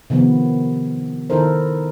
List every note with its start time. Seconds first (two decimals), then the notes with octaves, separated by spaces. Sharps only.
0.10 C3 D#3 F3 B3
1.30 D#3 D#4 E4 A4 A#4 C5